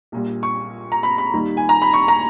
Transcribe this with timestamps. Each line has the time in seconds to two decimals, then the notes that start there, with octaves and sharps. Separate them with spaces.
0.12 A#1 A#2 G3
0.43 C#6
0.92 A#5
1.03 B5
1.18 B5
1.33 D#2 D#3 G3
1.57 G#5
1.69 A#5
1.82 B5
1.94 C#6
2.08 A#5